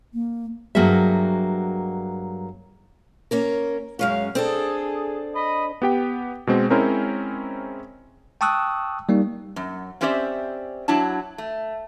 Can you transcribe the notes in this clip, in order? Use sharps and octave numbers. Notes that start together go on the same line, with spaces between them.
A#3
G2 F#3 A#3 F#4 G#4 E5
A#3 C#4 A#4
F#2 G#3 C#4 F5
C4 D4 G#4 A4
D#5 B5
B3 G4 G5
B2 G#3 C4
G#3 C4 C#4 E4 A#4 C5
G5 A5 C#6 D#6 E6 F#6
G3 A#3 D#4
F#2
C4 C#4 G4 C5 D5 E5
F#3 D4 E4 C#5 A5
A3